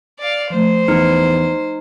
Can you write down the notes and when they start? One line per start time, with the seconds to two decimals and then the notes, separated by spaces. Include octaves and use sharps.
0.19 D5 F5
0.50 F3 A3 C5
0.88 E2 D#4